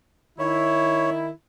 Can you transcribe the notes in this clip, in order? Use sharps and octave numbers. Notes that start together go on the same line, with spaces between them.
D#3 E4 C#5